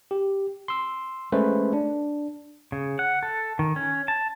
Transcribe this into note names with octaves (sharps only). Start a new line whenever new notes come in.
G4
C6 E6
G#3 A3 C#4 B4 C5
D4
C#3
F#5
A4
D#3
C#4
A5